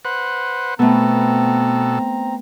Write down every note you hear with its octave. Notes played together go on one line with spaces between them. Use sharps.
B4 C5 F#5
B2 A3 B3 C4 A4 A#5